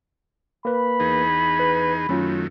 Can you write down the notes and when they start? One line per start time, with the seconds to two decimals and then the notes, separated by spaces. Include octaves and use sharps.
0.65 A#3 B4 B5
1.00 E2 D#4 G#4
1.60 B4
2.09 F#2 D#3 F#3 A3 C#4 F4